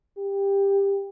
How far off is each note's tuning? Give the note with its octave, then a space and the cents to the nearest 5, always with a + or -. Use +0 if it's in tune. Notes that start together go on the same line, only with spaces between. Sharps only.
G4 +15